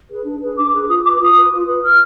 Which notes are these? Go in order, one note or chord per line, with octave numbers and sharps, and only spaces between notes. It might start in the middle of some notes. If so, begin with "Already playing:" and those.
G#4 B4
D4
G#4 B4
D4 D6
G#4 B4
F4 D#6
B4 D6
F4 D#6
B4
F4
B4
F4 F6